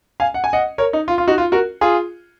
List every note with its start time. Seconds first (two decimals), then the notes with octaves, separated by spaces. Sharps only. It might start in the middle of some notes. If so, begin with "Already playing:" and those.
0.20 F5 G#5
0.34 F#5
0.44 G#5
0.53 D#5 F#5
0.78 A#4 C#5
0.93 D#4
1.08 F4
1.18 F4
1.28 D#4 F#4
1.38 F4
1.52 F#4 A#4
1.81 F4 G#4